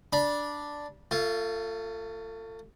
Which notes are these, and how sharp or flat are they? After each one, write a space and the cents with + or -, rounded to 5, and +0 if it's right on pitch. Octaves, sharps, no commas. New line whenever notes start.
D4 +0 B5 -30
A3 +30 F4 +0